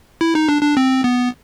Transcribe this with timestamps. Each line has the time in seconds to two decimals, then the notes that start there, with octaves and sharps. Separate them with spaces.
0.21 E4
0.35 D#4
0.49 D4
0.63 D4
0.77 C4
1.04 B3